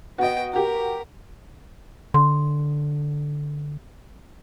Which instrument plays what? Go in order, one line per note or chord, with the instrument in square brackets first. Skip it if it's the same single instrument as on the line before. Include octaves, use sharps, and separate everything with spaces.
[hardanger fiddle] B3 G5 [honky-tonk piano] F#4 D#5
[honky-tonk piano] F#4 G4 [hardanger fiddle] A#4
[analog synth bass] D3 [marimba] C6